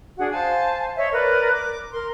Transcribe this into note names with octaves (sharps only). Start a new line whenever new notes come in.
D4 F#4 G#4 F#5
C5 F5 G#5 A5
C#5 D#5 E5
A#4 B4 D5
D6
A#4 C6